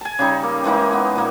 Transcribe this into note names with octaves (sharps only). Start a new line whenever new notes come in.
G#5 A5
C#3 G3 D#4
A#3
E3 G#3 A#3 D#4
B3
A#2 A#3